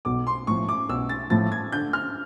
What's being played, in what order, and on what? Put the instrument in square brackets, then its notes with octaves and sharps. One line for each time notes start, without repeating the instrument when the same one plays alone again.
[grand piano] B1 [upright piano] D6
[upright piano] C6
[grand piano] A2 F3 [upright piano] C#6
[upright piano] D6
[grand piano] B1 [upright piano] E6
[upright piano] A6
[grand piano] A2 F3 [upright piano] A6
[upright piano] G#6
[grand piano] D3 [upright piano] G6
[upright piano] F6